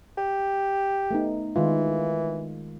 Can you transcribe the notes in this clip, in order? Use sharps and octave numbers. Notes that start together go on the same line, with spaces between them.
G4
A3 B3 D#4
D#3 E3 G#3 F4